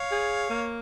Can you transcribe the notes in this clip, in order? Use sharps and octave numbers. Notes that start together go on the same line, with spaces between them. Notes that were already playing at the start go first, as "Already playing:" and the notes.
Already playing: C#5 F5
G#4
A#3